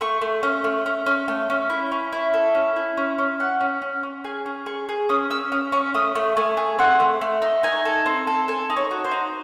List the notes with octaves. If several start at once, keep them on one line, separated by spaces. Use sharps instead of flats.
A3 C#6
A3
C#4
A3
C#4
C#4
A3
C#4
E4
C#4
E4
A4
C#4
E4
C#4
C#4
C#4 F#5
C#4
C#4
C#4
G#4 G#5
C#4
G#4 C#6
G#4
C#4 D#6
C#4 E6
C#4 D#6
C#4 C#6
A3 D#6
A3
A3 G#5
G#4
C4 F#5
A3
A3
D#4
D#4 G#5
A4
C4
A4
A4 G#5
D#4
C#5
F#4
C5
D#4